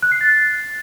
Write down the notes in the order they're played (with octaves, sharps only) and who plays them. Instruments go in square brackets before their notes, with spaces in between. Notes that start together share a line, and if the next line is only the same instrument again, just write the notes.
[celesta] F#6
C7
A6